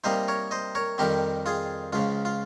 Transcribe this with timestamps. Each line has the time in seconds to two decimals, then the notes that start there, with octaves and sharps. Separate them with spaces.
0.04 C3 G3 A#3 D#4 C5 D#5
0.28 A#4 C#5
0.51 C5 D#5
0.75 A#4 C#5
0.98 F2 D#3 G3 C4 G4 A#4
1.46 F4 G#4
1.93 C#2 C#3 F3 F4
2.25 F4